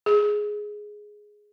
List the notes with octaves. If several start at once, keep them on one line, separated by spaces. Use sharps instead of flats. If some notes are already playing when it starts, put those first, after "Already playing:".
G#4